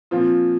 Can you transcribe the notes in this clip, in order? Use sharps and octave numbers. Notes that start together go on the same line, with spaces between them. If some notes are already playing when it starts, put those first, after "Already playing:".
A#2 F3 C4 F4